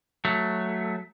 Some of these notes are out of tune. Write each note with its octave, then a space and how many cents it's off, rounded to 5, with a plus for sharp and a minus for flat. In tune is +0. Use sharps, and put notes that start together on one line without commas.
F#3 +0 A3 +0